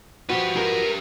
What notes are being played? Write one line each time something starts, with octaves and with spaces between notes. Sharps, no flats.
F3 F#4 G4 B4
A#4